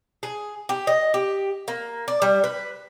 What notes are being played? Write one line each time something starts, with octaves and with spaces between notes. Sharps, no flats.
G#4
G4
D#5
G4
A#3
D5
G3
B4